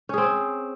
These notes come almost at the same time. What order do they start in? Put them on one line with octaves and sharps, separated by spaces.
C#4 G#4 C4